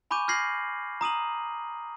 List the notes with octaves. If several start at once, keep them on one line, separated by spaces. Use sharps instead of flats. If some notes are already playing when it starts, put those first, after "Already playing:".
G#5 B5 C#6 D6 G6 D#7
F6 G6 G#6 A#6 C7 F#7
A#5 D#6 D#7 F#7